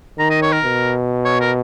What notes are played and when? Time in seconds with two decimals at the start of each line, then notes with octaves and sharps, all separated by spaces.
0.18 D#3 A#5
0.30 D#5
0.42 C#5
0.53 A#4
0.64 B2
1.25 C#5
1.41 A#4